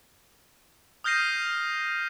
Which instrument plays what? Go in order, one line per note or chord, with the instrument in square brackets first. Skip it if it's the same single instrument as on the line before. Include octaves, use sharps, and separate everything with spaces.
[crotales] D#6 F6 G6 A#6 C7 D#7